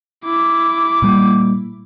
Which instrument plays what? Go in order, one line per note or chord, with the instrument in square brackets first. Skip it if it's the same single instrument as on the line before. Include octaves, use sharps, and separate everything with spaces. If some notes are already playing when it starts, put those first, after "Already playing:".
[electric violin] E4 D6
[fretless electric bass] A#2 G3 A#3